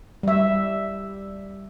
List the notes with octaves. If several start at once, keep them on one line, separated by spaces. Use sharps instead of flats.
G3 E5